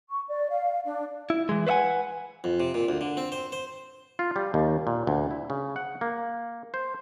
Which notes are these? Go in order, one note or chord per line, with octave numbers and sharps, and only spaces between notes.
C#6
D5
F5
D4
E4
E3 G#3
B4 C5 E5 F#5 G#5
F2
C3
A#2
D2
D3
C4
C5
C5
F4
G3
D#2
A#2
D2
E4
C#3
F#5
A#3
C5